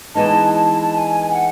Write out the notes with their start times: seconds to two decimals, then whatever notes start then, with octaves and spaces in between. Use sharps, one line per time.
0.15 E3 G#3 B3 D#4 A5
0.54 A5
0.81 A5
0.93 G#5
1.31 F#5